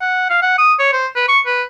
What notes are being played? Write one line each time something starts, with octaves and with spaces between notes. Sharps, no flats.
F#5
F5
F#5
D#6
C#5
C5
B4
C#6
B4